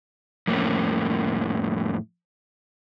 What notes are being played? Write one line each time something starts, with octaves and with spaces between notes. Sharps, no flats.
F2 A2 A#3 C#4